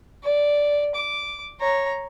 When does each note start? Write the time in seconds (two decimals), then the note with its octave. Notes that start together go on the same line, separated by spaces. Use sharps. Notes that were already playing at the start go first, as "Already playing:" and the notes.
0.23 D5
0.95 D6
1.60 C#5 A#5